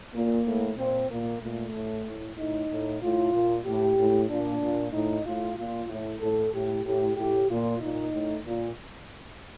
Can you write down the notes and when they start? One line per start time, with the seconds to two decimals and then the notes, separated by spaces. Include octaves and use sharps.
0.14 A#2 A#3
0.46 A2
0.77 A#2 C4
1.09 A#2 A#3
1.41 A#2 A3
1.73 A2
2.06 A2
2.37 A2 D#4
2.70 A2
3.01 A2 F4
3.33 A#2
3.65 A2 G4
3.98 A2
4.29 A#2 D4
4.62 A#2
4.93 A2 D#4
5.25 A2 F4
5.57 A#2 F4
5.88 A2
6.20 A2 A4
6.53 A2 G4
6.84 A2 G4
7.16 A2 G4
7.49 A#2 F4
7.80 A#2 D#4
8.13 A2
8.45 A#2